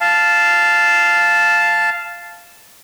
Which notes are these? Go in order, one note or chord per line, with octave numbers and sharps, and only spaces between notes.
F5 A5